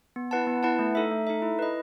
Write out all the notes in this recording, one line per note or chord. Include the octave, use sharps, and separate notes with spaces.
B3
E4 B4 F#5 A5
B3
E4 B4 F#5 A5
A3
D#4 A4 E5
A3
D#4 A4 E5
E4
B4 D#5